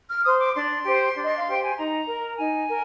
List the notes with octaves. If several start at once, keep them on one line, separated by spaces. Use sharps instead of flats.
F6
C5 D#6
D6
D4 C6
G4 C5
D4
D#5
F5
G4 C5 G5
G#5
D#4 A#5
A#4
D#4 G#5
A#4